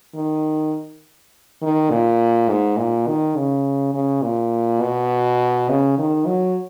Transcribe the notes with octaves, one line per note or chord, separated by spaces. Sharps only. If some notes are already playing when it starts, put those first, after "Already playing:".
D#3
D#3
A#2
G#2
A#2
D#3
C#3
C#3
A#2
B2
C#3
D#3
F#3